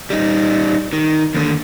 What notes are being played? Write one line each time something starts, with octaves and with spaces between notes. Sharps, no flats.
G3 D#4
D#3
D#2 D3